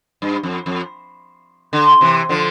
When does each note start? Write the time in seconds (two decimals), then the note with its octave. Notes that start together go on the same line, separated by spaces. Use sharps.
0.22 G2
0.43 F2
0.66 F2
1.73 D3
2.01 C3 E3
2.29 D3 F3